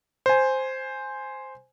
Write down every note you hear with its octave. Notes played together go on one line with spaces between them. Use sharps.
C5 G#5